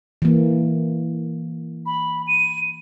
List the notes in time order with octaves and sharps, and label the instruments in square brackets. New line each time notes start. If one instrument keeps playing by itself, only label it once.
[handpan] E3 A#3
[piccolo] B5
D#7